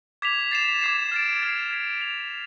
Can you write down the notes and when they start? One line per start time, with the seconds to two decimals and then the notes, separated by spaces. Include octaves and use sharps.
0.22 D6 G#6 B6 F7
0.51 A6 C7 E7
0.81 D6 G#6 C7 E7
1.11 F6 A6 D7
1.42 F6 G#6 C7
1.71 G#6 B6 E7
2.01 G#6 D7 F7